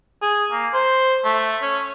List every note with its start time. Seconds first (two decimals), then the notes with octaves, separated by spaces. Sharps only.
0.22 G#4
0.52 A#3
0.74 C5
1.24 A3
1.62 C#4